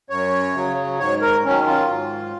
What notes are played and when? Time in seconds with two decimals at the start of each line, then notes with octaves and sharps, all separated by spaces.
0.10 F#2 C#5
0.55 C#3 F#3
0.99 G#2 C#5
1.22 A#4
1.44 D#3 F#3 C#4
1.66 F4
1.89 G#2